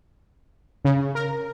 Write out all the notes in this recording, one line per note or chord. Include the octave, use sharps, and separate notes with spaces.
C#3
A#4